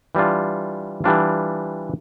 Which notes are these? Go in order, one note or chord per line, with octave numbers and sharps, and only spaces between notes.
E3 G3 D4 F4
E3 G3 D4 F4